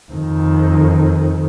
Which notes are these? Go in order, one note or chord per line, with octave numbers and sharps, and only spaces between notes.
F2 D#3